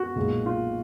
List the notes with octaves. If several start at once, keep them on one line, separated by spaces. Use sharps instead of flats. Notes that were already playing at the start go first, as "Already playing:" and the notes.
Already playing: F#4
B1 A#2 G#3
F4